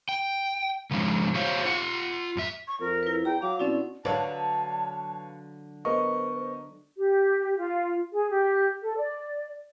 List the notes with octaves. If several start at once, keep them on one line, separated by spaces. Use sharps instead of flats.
G5
C#3 F3 G#3 D4
F#4 C5 C#5 E5 F5
F4 F#5
F#2 E5
C#6
F2 A#4
E4 B4
E2 G5 A#5
F#3 F5 D6
B2 C4 C#4 E4 D5
D3 F#3 B4 C#5 D5 F5 A5
B3 A#4 C5 D#5 C#6
G4
F4
G#4
G4
A4
D5